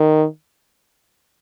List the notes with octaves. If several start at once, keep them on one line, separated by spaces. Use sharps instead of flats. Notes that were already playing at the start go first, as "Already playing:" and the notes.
Already playing: D#3